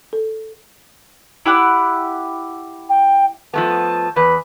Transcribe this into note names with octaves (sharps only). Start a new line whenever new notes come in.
A4
E4 G4 F#5
G5
F3 A3 B3 A5
E2 B4